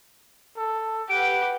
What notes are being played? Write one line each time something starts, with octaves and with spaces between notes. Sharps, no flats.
A4
G4 B4 F#5 D7